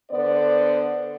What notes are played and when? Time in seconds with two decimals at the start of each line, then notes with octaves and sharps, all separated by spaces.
0.11 D3 B3 C5 D5